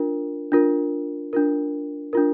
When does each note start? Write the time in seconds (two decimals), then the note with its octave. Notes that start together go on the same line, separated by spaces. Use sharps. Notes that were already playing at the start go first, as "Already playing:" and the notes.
Already playing: D4 F4 A#4
0.52 D4 F4 A#4
1.33 D4 F4 A#4
2.13 D4 F4 A#4